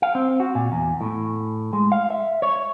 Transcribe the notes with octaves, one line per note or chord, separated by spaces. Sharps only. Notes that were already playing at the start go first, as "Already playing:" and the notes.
F5
C4
F#4
A#2
E2
A2
G#3
F5
E5
C#5